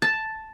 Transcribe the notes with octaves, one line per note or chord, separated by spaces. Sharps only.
A5